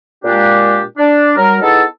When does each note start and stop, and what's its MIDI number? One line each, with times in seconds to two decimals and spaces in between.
0.24 0.81 46
0.24 0.81 56
0.24 0.81 62
0.24 0.81 67
0.98 1.32 62
1.37 1.57 54
1.37 1.57 55
1.37 1.57 70
1.61 1.83 59
1.61 1.83 63
1.61 1.83 64
1.61 1.83 68
1.61 1.83 69